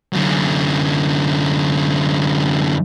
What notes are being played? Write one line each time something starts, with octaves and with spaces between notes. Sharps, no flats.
F#2 D3